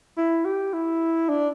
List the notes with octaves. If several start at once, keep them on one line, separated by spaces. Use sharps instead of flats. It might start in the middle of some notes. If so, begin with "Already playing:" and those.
E4
G4
E4
D4